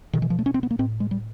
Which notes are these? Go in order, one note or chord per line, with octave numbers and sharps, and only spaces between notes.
B2 D#3
E3
F3
A3
C#4
C4
B3
A#3
A2 C4
G#3
G3